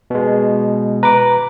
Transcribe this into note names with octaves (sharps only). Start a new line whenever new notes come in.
B2 G#3
B4 A#5 D6